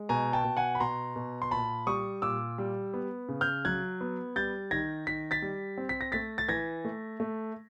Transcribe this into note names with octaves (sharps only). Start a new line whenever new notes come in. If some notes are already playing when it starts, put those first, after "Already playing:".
Already playing: G#3
B2 G#5 A#5
G5 A5
B2
F#5 G#5
B5
B2 A#5 C6
B2
C6
A#2 A5 B5
G3 C#6 D#6
A#2 D6 E6
G3
B3
C#3
F6 G6
F#3 F#6 G#6
B3
G3 G6 A6
D#3 G#6 A#6
D#3 B6
A6 B6
G3
C4
B6
A#6
A3 A6 B6
A6
E3 G#6 A#6
A3
A3